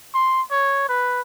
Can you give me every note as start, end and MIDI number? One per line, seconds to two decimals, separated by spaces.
0.14 0.42 84
0.51 0.87 73
0.89 1.21 71